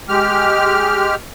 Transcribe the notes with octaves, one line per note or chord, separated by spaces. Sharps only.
G#3 G4 F6